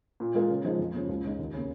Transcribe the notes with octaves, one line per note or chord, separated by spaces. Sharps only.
A#2
G#3 F4 A#4
C#3
F3 G#3 D#4
F2
C#3 F3 A#3
C#2
C#3 G#3 D#4
D#2
C#3 A#3